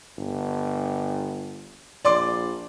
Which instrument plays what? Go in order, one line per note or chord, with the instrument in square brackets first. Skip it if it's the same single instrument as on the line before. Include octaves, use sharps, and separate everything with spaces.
[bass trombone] G1
[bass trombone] A#1 [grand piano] D5 C6 D6